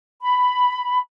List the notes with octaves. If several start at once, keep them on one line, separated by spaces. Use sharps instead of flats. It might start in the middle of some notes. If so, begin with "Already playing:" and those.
B5